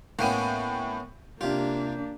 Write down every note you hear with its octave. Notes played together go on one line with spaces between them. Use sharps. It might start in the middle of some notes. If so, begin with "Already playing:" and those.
A2 A#3 B3 C#4 G5 D#7
C3 A#3 D4 F4 G4